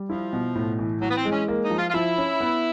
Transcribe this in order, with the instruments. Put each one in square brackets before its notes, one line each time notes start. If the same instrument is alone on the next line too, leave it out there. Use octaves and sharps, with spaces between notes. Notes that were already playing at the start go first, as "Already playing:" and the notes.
Already playing: [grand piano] G3
[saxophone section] F3 [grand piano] E4
[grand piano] B2
A2
E3
[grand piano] E3 [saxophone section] F#3
[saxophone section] B3
C4
[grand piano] G#3
[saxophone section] C#4
[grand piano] A#3
[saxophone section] D#4
[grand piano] F3
[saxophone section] F4
F4
[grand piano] F3 [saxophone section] E4
[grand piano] C#4
B3